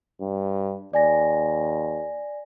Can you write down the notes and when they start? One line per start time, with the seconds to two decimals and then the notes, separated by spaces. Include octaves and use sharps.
0.21 G2
0.94 D#2 D5 G#5 A#6